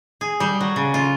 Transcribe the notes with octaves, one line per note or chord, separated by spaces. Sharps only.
G#4
G3
F#3
C#3
F4